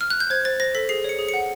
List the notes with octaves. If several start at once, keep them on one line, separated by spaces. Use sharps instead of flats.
F6
F#6
G6
C5 G#6
C5 A6
C5 A#6
A4 B6
G#4 C7
C#5 C#7
G#4
C#7
F#5